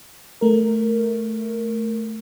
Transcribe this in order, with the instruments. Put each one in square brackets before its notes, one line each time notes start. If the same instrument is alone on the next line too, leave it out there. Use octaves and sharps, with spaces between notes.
[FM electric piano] A3 A#4